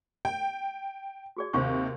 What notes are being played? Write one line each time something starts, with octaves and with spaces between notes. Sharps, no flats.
G5
F#4 G#4 D5
D#2 C3 C5 F5 C#6